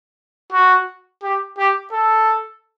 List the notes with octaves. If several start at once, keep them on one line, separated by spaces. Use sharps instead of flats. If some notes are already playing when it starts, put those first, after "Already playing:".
F#4
G4
G4
A4